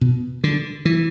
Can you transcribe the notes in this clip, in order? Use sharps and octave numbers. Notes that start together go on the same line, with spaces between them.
B2
D3
E3